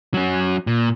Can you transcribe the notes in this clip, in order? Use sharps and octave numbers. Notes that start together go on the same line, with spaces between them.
F#3 C#4
A#2